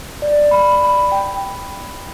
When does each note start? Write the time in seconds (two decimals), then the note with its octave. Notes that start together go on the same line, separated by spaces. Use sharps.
0.22 D5
0.51 B5
0.82 B5
1.12 G5